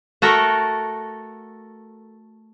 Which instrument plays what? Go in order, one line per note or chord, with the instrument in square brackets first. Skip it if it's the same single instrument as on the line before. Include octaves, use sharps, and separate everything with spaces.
[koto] A3 F#4 A4 A#4